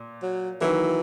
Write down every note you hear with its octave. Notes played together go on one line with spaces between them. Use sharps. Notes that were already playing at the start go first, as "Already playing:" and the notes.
Already playing: A#2
F#3
D#3 E3 F#3 A#3 E4